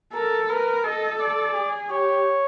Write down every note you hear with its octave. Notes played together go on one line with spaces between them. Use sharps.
A4 A#4
A#4 B4
A4 D#5
D5
G#4
G4 C#5